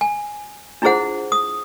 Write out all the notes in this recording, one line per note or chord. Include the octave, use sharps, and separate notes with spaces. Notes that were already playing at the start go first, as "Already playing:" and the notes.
G#5
D4 E4 F4 G#4 C5 F#5
D#6